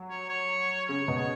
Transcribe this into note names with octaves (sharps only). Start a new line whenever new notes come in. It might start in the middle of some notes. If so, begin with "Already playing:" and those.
Already playing: F#3
C#5
C#5
C#3 C#5
B2
C#5